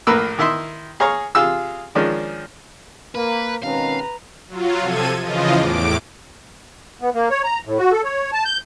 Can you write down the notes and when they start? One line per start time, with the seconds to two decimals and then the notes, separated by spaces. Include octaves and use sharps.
0.07 A#1 A2 A#3 A#4 B4 E6
0.38 D#3 E4 E5 C6 D#6
1.00 G#4 C#5 F5 A#5 C#6
1.35 C3 F4 G#4 E6
1.95 D#3 F3 G#3 C#4 D4
3.15 A#3 B4
3.63 B2 D#3 G#3 C4 C#4 B4 F5 A#5
4.48 F#3 F4
4.80 C3 F3 A4 G#6 D#7
5.22 C#3 E3 F3 F4 D#5
5.55 E2 A2 D6 D7
7.02 B3
7.14 A#3
7.30 C#5
7.44 A#5
7.65 A2
7.78 F#4
7.92 A4
8.03 C#5
8.33 A5
8.45 G6